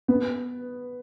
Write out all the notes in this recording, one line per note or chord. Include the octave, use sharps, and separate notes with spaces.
B3